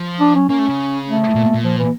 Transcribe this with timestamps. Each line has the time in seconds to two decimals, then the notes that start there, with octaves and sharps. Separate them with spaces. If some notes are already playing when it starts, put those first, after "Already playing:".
Already playing: F3
0.20 D4
0.35 C#4
0.49 A#3 C#4
0.59 A3
0.69 C#3
1.07 A3
1.35 A#2
1.54 A#2
1.64 F3
1.78 E3